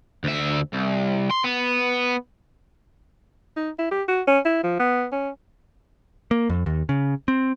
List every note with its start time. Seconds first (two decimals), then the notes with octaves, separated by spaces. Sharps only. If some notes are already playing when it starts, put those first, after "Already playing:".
0.24 D2 E5
0.73 C2
1.30 C6
1.44 B3
3.57 D#4
3.79 E4
3.91 G4
4.08 F#4
4.28 C#4
4.45 E4
4.63 F3
4.80 B3
5.12 C#4
6.31 A#3
6.50 F2
6.66 D#2
6.89 C#3
7.28 C4